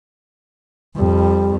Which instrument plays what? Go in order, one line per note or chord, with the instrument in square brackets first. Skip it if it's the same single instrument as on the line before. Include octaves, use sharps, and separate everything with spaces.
[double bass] F2 [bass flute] G3